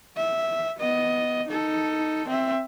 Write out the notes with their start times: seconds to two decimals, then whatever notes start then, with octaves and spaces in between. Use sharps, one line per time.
0.16 E5
0.78 B3 D#5
1.48 D#4 A4
2.28 C4 E5